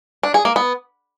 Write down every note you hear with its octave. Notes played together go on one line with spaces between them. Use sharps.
D4
G#4
A#3
B3